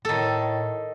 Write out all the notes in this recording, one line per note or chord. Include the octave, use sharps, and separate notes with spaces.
A2 D#3 A4